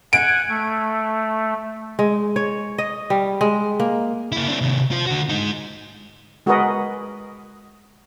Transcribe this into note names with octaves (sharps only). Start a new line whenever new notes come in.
F#5 G#5 D7
A3
G#3
C#5
D#5
G3
G#3
A#3
A#3 E4
C4 D4
C3 D#3
F4 C5
D3 F#4
G#3 D#4
G#3 F#4 G#4 A#4 B4 D#5